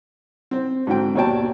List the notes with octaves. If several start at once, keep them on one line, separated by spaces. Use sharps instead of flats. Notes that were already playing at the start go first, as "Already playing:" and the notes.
C4 C5
G#2 D3 F#3 C4 G5
D#2 B2 C#5 D5 G5 A5